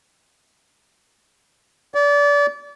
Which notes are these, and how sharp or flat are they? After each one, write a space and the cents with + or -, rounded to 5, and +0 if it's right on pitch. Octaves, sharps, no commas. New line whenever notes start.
D5 -30